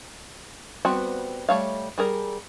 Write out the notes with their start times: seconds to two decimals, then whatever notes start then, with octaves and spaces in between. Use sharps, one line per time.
0.85 G3 B3 C4 F#4
1.49 G3 A3 C#5 F5
1.98 G3 G#4 A#4